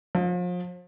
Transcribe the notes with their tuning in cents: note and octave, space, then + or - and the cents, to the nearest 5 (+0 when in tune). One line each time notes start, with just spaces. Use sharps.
F3 +35